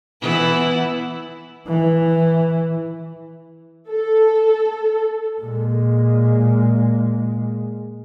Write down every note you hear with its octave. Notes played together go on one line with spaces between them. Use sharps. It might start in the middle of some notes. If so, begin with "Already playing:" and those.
E3 B3 E4
E3
A4
A#2 G#3